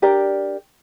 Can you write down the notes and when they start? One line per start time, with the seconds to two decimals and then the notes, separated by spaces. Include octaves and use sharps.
0.02 D4 G4 A#4 D5